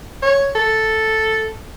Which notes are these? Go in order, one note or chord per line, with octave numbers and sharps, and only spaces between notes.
C#5
A4